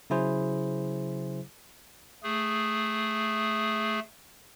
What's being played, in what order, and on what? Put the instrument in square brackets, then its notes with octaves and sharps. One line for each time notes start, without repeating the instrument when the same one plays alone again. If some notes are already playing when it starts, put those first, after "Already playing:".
[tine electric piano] C#3 F#3 E4 G#4 C5
[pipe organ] A3 G#4